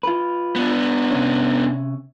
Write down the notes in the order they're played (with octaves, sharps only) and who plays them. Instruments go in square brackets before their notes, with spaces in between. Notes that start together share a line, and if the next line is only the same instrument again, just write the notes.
[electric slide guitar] F4 B4
[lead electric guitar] B3 D4
[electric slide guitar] C3 C#4